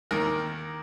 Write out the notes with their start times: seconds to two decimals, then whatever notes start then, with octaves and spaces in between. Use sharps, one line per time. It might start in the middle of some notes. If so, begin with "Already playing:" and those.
0.11 D#2 D#3 A#4